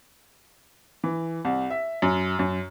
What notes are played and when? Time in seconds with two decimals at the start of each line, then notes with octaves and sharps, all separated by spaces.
1.04 E3
1.45 C2
1.70 E5
2.02 F#2
2.39 F#2